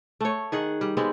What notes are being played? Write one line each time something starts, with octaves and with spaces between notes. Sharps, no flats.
A3 C#5
D#3 G#4 F#5
G3
G3 G#3 B3 C4